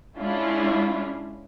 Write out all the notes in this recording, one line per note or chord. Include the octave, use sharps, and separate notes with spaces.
G#3 C#4 D4 E4 F4